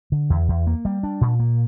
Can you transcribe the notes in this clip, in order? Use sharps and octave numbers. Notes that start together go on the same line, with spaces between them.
D3
E2
E2
A#3
G3
D4
A#2
A#3